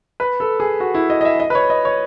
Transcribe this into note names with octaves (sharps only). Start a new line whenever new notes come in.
B4
A4
G#4
F#4
E4
D#5
D#5
E5
D#5
B4
C#5
D#5
C#5